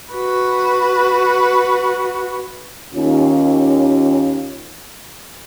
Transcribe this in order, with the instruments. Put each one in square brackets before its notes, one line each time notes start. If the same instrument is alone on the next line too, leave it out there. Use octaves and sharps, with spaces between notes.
[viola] F#4 B4
[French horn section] D#2 C#4 F4